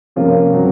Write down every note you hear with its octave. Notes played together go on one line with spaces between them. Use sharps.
C3 F3 A#3 C#4 F4
C#3 F#3 C4